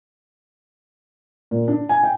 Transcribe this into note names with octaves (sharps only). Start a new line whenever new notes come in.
A#2
D4
G#5
G5